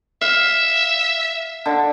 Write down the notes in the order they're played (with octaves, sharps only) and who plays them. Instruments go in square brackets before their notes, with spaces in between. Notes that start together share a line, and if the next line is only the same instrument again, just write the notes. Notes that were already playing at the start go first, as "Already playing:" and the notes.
[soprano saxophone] E5 [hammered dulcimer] F5
[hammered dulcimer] D3